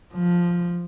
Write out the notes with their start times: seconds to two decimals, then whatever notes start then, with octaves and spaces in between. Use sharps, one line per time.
0.14 F3